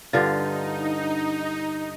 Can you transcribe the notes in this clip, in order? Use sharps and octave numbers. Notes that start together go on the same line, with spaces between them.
G2 D3 D#4 F4